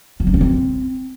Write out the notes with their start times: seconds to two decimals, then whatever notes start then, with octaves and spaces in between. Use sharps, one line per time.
0.20 F#3
0.27 C4
0.34 C#4
0.41 C4